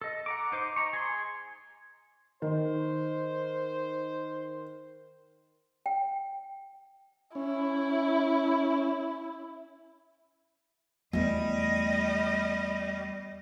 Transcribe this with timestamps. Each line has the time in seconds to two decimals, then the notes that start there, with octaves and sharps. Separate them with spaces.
0.01 A4 D#5
0.26 F#5 A#5 D6
0.52 D#4 C5 D6
0.76 D#5 A#5 C#6
0.93 G#4 C6
2.42 D#3 C5
5.86 G5
7.35 C#4 E4
11.13 E2 G3 A3 D#5